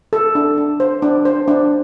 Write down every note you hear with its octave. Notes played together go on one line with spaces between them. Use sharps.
A4
D4
D4
C5
D4
C5
D4